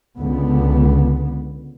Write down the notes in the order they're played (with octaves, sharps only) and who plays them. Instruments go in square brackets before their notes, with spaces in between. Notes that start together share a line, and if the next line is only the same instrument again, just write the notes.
[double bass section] C#2 D3 B3